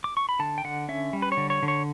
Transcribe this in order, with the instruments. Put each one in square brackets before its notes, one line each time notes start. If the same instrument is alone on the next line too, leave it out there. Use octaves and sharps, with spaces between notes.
[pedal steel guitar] D6
C#6
B5
D3 A5
G5
D3 F#5
C#4 E5
G3
B4
C#5
D3
C#5
D3
C#5